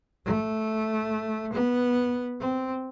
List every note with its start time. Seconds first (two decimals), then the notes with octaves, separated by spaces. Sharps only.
0.25 A3
1.53 B3
2.40 C4